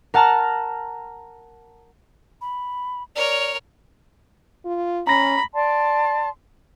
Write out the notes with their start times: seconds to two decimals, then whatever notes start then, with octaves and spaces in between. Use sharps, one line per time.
0.14 A#4 F#5 A5 A#5 F6
2.41 B5
3.15 A#4 C#5 D5
4.65 F4
5.07 C#4 A#5 B5 A#6
5.53 D5 A5 C6